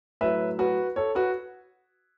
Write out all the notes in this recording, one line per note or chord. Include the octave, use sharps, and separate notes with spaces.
A2 F#3 B4 E5
F#4 B4
A4 C#5
F#4 B4